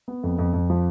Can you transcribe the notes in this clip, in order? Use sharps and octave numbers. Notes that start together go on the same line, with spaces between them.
B3
F2
F2
F2
F3